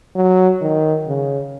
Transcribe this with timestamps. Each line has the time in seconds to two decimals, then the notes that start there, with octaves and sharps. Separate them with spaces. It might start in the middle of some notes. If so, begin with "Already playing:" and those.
0.16 F#3
0.62 D#3
1.07 C#3